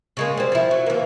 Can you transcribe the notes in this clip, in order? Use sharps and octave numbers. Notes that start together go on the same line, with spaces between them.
C#3 G#3 A#3
G3 C4
F3 E4
F#3
E3 A#3